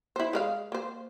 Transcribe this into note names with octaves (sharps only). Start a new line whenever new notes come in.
E4 C5
G#3 A#4 F5
A#3 C5